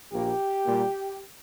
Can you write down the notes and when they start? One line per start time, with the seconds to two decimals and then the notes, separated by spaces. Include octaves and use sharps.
0.13 A#1 A#2 A#3 G4
0.65 A#2 G3 A#3